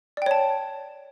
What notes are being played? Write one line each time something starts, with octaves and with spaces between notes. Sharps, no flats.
C#5 D5 G5 A5